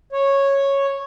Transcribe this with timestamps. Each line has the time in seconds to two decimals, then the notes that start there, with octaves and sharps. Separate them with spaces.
0.13 C#5